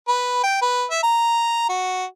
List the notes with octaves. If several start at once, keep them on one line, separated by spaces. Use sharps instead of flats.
B4
G5
B4
E5
A#5
F#4